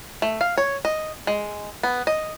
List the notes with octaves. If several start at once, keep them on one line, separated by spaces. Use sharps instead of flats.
A3
F5
C#5
D#5
G#3
B3
D#5